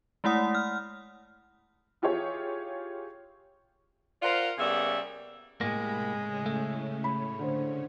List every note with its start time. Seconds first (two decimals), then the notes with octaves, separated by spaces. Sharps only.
0.24 G#3 A3 E4 F#5 D#6
0.55 F6
2.02 E4 F4 G4 G#4 C#5
4.22 F4 A#4 C5 D5 F#5
4.58 C#3 G3 A#3 B3 E5
5.61 A2 C3 G#3 A#3 B5 A#6
6.14 A2 C#3 C#4
6.46 A3
7.04 B5
7.39 D3 C5